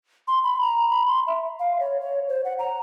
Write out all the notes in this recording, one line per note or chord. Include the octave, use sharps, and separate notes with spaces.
C6
B5
A#5
B5
C6
E5
F5
C#5
C#5
C5
F#5
A#5